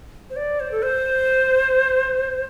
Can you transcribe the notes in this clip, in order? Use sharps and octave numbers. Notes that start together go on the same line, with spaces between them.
C5
D5
C5
A4
C5